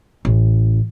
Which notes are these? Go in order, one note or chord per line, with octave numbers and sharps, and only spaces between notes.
A1